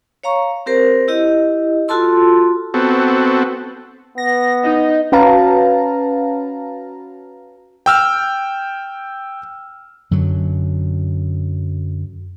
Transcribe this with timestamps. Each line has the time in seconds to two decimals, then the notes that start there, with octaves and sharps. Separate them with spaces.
0.24 C#5 F5 A#5 C#6
0.66 C4 G4 A#4 C5
1.08 E4 G4 D#5
1.88 F4 F#4 A4 A5 C6 E6
2.74 B3 C4 F#4 A4
4.18 B3 A#6
4.64 D#4 D#5
5.12 C#4 F#4 B4 F5 A5 A#5
7.86 G5 E6 F6
10.11 F#2 D3 F#3